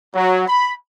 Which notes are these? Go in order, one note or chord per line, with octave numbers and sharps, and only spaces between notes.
F#3
B5